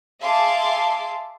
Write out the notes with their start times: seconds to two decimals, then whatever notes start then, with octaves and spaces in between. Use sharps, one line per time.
0.21 G#4 E5 F5 A5 C6 D6